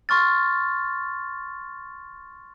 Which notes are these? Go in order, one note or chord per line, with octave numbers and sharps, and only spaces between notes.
C6 C#6 F6 A6